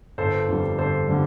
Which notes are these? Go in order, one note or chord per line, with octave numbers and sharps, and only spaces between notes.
G1 A4 C5
F2 D3 G3
G1 A4 C5
D3 G3